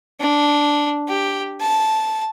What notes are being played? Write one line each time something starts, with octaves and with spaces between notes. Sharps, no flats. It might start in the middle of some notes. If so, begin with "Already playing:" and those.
D4
G4
A5